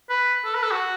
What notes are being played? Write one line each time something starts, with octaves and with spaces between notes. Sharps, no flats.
B4
A4
B4
A4
F#4